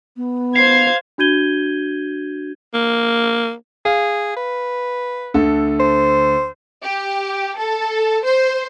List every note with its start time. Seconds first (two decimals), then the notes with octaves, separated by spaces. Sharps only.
0.17 B3
0.56 C5 F5 G#6
1.18 D4 F#4 G6 G#6 D#7 G7
2.74 A#3
3.85 G#4 F5
4.37 B4
5.34 D2 D3 A4
5.80 C5
6.83 G4
7.58 A4
8.24 C5